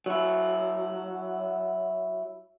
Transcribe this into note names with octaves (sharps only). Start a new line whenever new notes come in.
F#3 E4